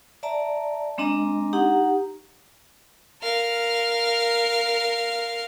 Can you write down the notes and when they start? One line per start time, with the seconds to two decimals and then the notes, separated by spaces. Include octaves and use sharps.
0.23 D5 E5 A5 A#5
0.98 G#3 C4 D4 D#5 A#5
1.53 D#4 G4 F#5 A#5
3.22 A#4 F5